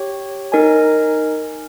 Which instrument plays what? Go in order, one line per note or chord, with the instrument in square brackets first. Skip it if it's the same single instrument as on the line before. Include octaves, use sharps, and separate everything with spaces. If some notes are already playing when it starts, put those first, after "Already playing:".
Already playing: [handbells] G4 C#5 G5
D#4 A#4 D#5 G#5